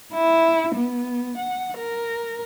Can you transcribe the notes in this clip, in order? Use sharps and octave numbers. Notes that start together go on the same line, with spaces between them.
E4
B3
F#5
A#4